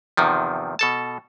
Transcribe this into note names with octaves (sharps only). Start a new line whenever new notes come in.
E2 C3 D#3 F3
B2 A4 A5